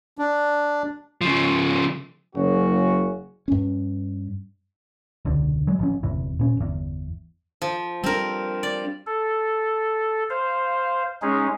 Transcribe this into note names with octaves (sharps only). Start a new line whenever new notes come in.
D4
C#3 F3
F#1 F#2 C#3 C#4 F#4
G2 C#4
E1 C#2 D3
F#3 G#3
A1 F3 C#4
G1 E2 C3 E3
A#2 C#4
G1 E2
F3
G3 C4 D4 A#4
D5
A4
C5 F5
G#3 C#4 D#4 G#4